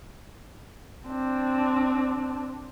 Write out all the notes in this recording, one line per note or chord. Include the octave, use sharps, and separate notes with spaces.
C4 D4